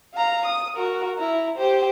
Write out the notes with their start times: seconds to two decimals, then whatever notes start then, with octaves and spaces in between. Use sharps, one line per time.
0.14 F5 A#5
0.46 D#6
0.76 F#4 A#4
1.18 E4 A#5
1.56 G4 C5